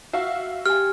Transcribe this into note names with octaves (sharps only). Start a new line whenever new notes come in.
F#4 E5 F5
G4 G#5 F6